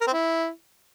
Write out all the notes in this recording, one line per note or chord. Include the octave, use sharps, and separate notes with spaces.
A#4
C4
E4